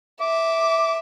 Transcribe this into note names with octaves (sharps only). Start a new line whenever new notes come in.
E5 D6